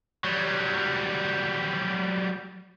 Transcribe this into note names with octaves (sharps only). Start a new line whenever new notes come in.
F#3 G3